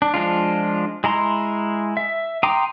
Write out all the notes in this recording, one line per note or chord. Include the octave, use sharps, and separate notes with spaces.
D4
F3 G#3 D4 F4
G#3 E4 A#5 C6
E5
G5 A#5 C6 D6 D#6